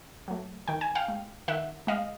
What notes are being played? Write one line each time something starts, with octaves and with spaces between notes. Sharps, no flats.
F#3 A3
D#3 G5
G#5
F5 G5
G#3
D#3 E5 F#5
G#3 D#5 F5